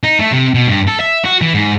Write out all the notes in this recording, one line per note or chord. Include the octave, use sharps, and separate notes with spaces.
D#4
A3
C3
B2
G2
A4
E5
F#4
E3
G#2